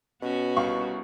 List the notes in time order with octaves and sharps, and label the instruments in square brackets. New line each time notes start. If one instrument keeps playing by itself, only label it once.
[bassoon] B2 [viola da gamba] B3 C#4 F#4
[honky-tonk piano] C2 C#6 [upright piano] F5